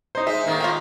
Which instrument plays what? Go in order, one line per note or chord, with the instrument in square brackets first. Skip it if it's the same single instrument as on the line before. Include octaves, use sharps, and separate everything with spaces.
[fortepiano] D#4 C5
[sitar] G#3 [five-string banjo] E5
[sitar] A2 D#3 A#3
[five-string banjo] F4 G4